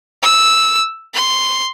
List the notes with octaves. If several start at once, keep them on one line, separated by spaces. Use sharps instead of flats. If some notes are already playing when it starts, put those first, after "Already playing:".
E6
C6